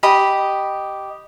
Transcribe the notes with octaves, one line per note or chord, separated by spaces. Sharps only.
G4 D#5 B5